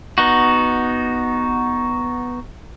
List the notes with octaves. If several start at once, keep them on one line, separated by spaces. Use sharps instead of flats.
B3 D#4 F#4